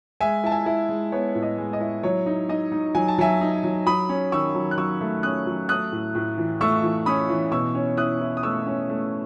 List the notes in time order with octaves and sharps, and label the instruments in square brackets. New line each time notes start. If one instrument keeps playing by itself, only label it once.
[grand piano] G#3 E5 G#5
E4 A5
E5 G#5
E4
G#3
B3 C#5
A2
D#5
G#3
D#5
E4
F#3 C#5
D#4
D#4 D#5
D#4
F#3 G#5
A5
F#3 E5 G#5
D#4
F#3
F#3 B5 D#6
C#4
D#3 C#6 E6
F#3
F#6
F#3 C#6 E6
A3
C#4 D#6 F#6
F#3
A3 D#6 F#6
A2
A2
E3
A3 C#6 E6
E3
C#4 B5 D#6
E3
B2 C#6 E6
C#4
E4 D#6 F#6
E4
D#6
A3 C#6 E6
C#4
A3